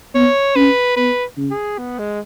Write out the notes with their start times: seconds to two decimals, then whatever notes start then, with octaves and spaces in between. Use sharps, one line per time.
0.15 B3 C#5
0.56 C#4 B4
0.96 B3 B4
1.37 C#3
1.51 G#4
1.78 B3
1.99 G#3